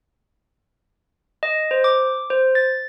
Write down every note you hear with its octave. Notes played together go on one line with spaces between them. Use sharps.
D#5
C5
D6
C5
A6